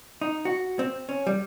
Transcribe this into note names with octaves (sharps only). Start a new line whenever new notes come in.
D#4
F#4
C4
C#4
G3